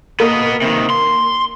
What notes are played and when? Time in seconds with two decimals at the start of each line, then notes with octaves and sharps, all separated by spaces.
0.20 A#3 B3 D#5
0.62 C3 D#3
0.90 C6